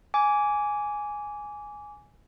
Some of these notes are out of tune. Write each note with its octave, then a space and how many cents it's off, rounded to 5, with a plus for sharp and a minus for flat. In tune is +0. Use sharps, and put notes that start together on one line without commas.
G#5 +0 D6 -20